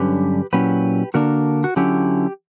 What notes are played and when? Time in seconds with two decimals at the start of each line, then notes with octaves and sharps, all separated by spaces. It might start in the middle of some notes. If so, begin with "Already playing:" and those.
Already playing: G2 D3 F#3 C#4 G4 B4
0.53 A#2 F#3 C#4 E4 G4 B4
1.14 D3 A#3 D4 F#4 A#4
1.64 F#4
1.76 D3 F#3 C#4 E4 G4